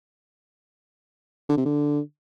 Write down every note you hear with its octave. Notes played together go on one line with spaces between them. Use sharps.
D3
C3
D3